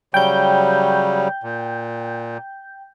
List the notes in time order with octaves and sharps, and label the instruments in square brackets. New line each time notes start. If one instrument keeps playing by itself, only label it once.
[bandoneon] C#3 F#3 G3 [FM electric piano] G5 G6
[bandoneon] A#2